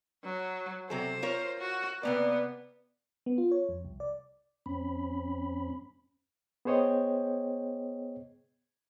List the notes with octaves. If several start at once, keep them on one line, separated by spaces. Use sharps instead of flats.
F#3
C3 F#3 A4 C5
F4 A#4 C#5
F#4
C3 A#3 B3 D5
B3
F4
C#5
F2
C2
D5
F2 C4 C#4 B5
B3 G#4 C5 C#5 D#5 G5